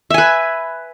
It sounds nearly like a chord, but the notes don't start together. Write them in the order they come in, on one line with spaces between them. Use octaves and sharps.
E5 G#5 B4